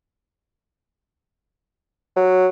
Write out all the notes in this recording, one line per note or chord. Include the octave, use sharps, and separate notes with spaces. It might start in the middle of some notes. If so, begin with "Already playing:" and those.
F#3